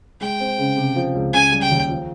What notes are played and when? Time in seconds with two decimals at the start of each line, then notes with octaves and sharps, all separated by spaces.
0.21 G#3 G5
0.40 C4
0.58 C#3
0.77 C3
0.96 F3
1.15 C#2
1.33 C#3 G#5
1.52 G3
1.62 G5
1.71 D#2
1.89 F3